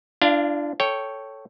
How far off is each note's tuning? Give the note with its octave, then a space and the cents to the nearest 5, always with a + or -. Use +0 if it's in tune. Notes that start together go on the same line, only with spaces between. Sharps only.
D4 +0 F4 -45 F5 -5
A4 +0 C#5 +0 G5 -5